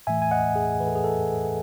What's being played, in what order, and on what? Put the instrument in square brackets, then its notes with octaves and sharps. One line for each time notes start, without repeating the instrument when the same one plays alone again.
[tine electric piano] A2 E3 A3 E5 G#5
G#5
D#5 F#5
G#4
A2 E3 A3 B4
A4
G#4
A4